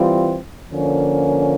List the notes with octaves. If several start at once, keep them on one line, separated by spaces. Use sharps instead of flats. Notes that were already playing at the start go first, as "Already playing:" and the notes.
Already playing: E3 G3 C4 F4
D3 F3 A#3 C#4